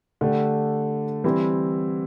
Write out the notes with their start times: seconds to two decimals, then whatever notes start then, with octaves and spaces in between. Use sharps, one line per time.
0.21 D3 A3 D4 G4
1.24 E3 G3 C4 E4 G4